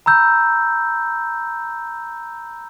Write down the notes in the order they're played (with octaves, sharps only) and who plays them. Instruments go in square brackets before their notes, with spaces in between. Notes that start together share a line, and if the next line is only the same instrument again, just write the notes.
[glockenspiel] A#5 B5 E6 G6